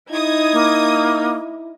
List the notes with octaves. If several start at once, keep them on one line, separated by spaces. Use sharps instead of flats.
D#4 E4 D#6 G#6
A#3